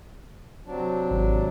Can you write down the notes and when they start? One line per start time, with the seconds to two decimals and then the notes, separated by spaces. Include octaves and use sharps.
0.66 C3 F#3 D4
1.11 G#1